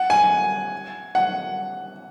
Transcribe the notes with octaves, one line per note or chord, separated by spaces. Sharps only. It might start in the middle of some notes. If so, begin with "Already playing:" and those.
Already playing: F#5
G#5
F#5